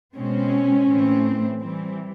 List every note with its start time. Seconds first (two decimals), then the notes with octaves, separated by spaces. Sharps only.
0.16 B2 G#3 C4 C#4
0.88 A2 E3 A3 C4
1.59 E3 G3 C4